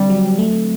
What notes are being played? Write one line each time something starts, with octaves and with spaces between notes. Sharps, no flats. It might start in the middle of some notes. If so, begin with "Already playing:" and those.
Already playing: D3 G3 C4
F#3
A3